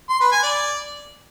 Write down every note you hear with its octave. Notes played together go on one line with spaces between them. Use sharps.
C6
B4
G#5
D5